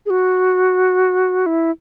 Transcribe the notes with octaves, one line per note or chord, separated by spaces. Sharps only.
G#4
F#4
E4